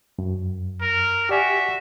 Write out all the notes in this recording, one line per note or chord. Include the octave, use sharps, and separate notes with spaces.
F#2
A#4
F#4 G4 D5 E5 G#5